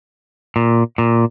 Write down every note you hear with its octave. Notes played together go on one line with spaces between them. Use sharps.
A#2
A#2